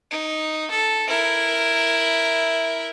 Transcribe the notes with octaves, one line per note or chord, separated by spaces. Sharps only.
D#4
A4
E4 A#4